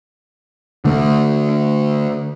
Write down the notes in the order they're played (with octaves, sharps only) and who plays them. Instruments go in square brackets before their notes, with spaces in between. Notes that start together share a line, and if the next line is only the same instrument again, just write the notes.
[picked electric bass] D3 A3